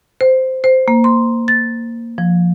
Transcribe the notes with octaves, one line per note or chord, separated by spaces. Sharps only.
C5
C5
A#3
C6
A6
F3